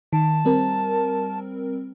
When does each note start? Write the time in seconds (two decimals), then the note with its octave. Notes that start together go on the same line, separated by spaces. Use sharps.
0.13 D#3 A5
0.45 G3 C4 A#4